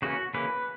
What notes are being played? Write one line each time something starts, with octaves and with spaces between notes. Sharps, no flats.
C#3 E3 A#3 C#4 F#4
C#3 E3 A#3 C#4 B4